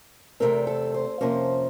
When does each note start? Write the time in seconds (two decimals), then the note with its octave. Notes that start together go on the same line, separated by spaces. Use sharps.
0.40 E2 C3 F3 A3 C4 A#4
0.67 A4
0.94 C5
1.21 F2 C3 F3 A#3 C#4 C5